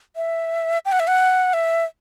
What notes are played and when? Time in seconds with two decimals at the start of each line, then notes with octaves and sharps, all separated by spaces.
0.16 E5
0.85 G5
0.92 F#5
1.00 E5
1.07 F#5
1.53 E5